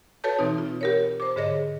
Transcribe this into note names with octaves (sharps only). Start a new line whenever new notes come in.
F#4 A4 B4 C#5 A5 G6
B2 E3 C4 D#4
F4
G4 A#4 C#5
C5 D6
G#2 D3 G#4 C#5 D#5 A#6